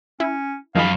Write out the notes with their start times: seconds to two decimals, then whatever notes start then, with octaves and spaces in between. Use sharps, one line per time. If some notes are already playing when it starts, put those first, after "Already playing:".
0.20 C#4 E4
0.75 F#2 D#3 F3 G#3 F5 B5